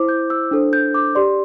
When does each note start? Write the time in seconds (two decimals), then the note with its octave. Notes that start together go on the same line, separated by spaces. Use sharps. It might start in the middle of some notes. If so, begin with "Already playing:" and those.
Already playing: E4 C5 D6
0.09 G6
0.30 E6
0.51 D4 A4 C5
0.73 G6
0.94 D6
1.15 G4 D5 C6